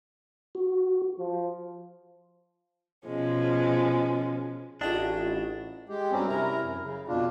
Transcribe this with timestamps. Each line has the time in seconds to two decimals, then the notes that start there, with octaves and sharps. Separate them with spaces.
0.55 F#4
1.19 F3
3.06 B2 F3 G#3 C#4
4.81 A1 D4 F4 F#4 G#4 D#5 G5
5.89 G#3 G4
6.12 G2 F#3 G3 C4 C#4
6.28 C3 E4 A#4 A#5
6.62 F#2
6.83 C#3
7.08 F2 B2 D4 F4